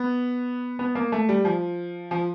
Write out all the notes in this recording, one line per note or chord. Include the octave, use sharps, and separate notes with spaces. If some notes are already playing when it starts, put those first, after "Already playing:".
Already playing: B3
B3
A#3
A3
G3
F3
F3